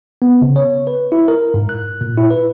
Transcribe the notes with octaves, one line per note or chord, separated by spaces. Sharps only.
B3
C#3
C#5
B4
E4
A#4
G#2
F#6
A#2
E4
B4